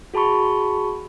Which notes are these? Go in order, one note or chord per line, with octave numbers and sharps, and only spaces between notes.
F#4 G#4 A5 B5 C#6